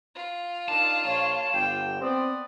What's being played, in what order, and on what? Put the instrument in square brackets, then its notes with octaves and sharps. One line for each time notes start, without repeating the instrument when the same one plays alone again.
[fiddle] F4
[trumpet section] D4 D#4 A#4 [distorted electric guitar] A5
[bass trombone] A#1 [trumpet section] C#5
[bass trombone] G1 [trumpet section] G4 G5
[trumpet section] B3 D5 D#6 [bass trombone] C4